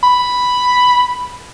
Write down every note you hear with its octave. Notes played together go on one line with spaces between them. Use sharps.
B5